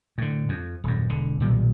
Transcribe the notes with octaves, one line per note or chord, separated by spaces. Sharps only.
A2 D3
F2
D#1 F#2
E1 D3
B1 A#2 D#3 G3